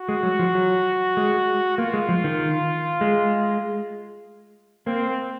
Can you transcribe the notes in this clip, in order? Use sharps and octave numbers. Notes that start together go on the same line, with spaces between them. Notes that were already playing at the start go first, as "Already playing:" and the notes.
Already playing: F#4
G#3
F#3
F3
F#3
G#3
A#3 F4
G#3
F3
D#3
G#3
A#3 C4